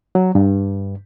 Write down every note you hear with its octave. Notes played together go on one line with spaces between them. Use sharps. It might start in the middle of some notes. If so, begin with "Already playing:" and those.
F#3
G2